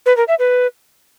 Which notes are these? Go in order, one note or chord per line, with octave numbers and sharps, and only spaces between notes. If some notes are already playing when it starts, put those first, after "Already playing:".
B4
A#4
E5
B4